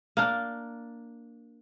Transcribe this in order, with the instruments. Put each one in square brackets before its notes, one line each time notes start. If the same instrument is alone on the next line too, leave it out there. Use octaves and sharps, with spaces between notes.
[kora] A#3 D4